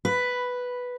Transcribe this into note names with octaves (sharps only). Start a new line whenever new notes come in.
B4